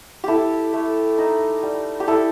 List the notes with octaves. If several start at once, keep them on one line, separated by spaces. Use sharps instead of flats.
E4 G4 A4
A3
D#4
G3
G4
E4 A4